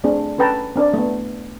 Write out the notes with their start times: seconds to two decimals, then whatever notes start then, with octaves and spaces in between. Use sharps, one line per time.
0.04 A3 C4 D4 G#4
0.38 C#4 A4 B4 G5 A5 A#5
0.76 C4 D4 A#4 D5
0.94 A3 B3